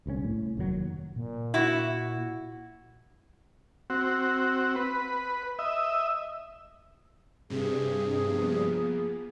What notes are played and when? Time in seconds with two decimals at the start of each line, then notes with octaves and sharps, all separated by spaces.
0.06 D1 C2 A#2 C#4
0.24 A2
0.57 F1 D#2 A#2 F#3
1.16 A#2
1.54 E4 F#4
3.90 C4 F#4
4.76 B4
5.59 D#5 E5
7.50 G2 C3 G#4
8.22 F3 A#3 B3